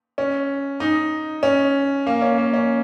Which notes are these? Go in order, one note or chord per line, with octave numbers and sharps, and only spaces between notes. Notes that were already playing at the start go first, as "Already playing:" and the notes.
C#4
D#4
C#4
A#3
C#4
A#3
C#4